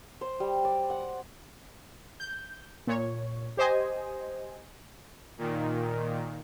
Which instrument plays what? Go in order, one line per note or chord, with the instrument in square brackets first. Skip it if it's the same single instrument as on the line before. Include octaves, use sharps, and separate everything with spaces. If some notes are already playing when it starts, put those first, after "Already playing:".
[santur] C5
G3
D5
F#5
[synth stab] G6
A#2 C#5
G4 C5 D#5 G#5
[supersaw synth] A#2 D#3